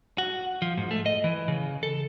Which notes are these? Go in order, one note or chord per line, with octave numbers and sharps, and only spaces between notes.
F#4
F3
G#2
A3
D#5
E3
C#3
A4